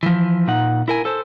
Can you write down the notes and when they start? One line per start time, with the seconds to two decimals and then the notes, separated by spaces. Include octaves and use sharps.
0.03 E3 F3
0.47 A#2 D#4 F#5
0.88 E4 A#4 G#5
1.05 A4 C5